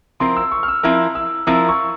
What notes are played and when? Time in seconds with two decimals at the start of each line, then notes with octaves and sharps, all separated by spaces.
0.20 F3 C4 E4 A#4 C6
0.36 E6
0.52 C#6
0.63 F6
0.68 E6
0.83 F3 C4 E4 A#4 F6
1.15 E6
1.47 F3 C4 E4 A#4 E6
1.69 C#6